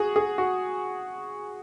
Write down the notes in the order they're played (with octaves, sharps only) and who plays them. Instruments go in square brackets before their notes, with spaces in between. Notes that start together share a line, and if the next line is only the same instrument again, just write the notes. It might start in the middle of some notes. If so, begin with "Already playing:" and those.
Already playing: [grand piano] F#4 G#4
G#4
F#4